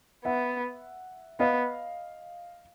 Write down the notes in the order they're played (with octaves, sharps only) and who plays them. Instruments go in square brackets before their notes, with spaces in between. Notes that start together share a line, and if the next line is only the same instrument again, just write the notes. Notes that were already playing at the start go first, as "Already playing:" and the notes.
[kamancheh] B3 [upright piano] E5 F#5
[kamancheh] B3 [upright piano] D#5 F5